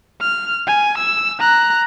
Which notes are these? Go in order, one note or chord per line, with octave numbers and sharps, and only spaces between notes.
F6
G#5
E6
A#5 F#6